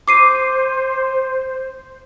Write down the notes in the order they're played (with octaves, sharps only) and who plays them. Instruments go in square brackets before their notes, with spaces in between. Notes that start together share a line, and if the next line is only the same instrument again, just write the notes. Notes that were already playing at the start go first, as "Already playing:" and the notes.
[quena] C5 [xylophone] D6 C7 D#7